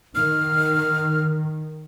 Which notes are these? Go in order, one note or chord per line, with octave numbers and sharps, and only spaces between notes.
D#3 F6